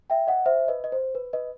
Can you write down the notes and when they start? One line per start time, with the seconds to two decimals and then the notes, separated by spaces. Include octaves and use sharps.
0.10 E5 G5
0.27 D#5 F#5
0.46 C5 E5
0.68 B4 D#5
0.84 D#5
0.92 C5
1.15 B4
1.33 B4 D#5